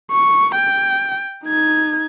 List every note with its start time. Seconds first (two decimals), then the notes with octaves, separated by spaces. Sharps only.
0.11 C#6
0.56 G5
1.45 D#4 G#6